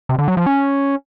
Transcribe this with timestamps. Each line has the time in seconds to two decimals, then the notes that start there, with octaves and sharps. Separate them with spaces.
0.09 C3
0.18 D3
0.28 F#3
0.37 F3
0.46 C#4